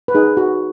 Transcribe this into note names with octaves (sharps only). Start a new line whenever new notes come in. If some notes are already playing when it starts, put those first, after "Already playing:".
B4
D#4 G#4
F#4